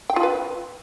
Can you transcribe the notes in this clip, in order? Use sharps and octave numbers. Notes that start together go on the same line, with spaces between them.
G5
F4
B4